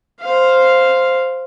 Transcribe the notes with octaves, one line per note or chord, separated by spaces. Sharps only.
C5 F5